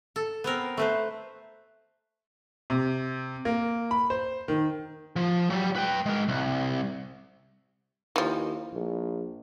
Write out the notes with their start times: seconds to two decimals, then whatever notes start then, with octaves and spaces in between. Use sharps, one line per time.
0.16 A4
0.44 B3 C4 A#4
0.77 A3 B4 C5
2.70 C3
3.45 A#3
3.91 B5
4.10 C5
4.48 D#3
5.16 F3
5.50 F#3 G3
5.76 B4 G5
6.06 G#3 A#4
6.28 C2
8.16 D#2 E3 F3
8.72 A#1